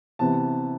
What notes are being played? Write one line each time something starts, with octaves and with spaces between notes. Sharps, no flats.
C3 E3 B3 A5